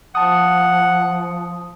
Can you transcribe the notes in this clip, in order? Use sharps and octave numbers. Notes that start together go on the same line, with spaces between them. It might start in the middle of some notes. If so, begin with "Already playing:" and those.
F3 F#5 A5 D#6